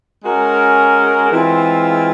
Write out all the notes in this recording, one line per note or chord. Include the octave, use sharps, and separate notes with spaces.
G#3 C#4 F#4 A#4
E3 G#3 C4 F4